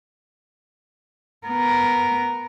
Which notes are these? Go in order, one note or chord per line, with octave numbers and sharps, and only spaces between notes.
B3 A#4